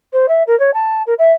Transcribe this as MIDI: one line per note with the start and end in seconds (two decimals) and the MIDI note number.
0.13 0.26 72
0.28 0.43 76
0.47 0.58 70
0.59 0.71 73
0.74 1.02 81
1.07 1.14 70
1.19 1.33 76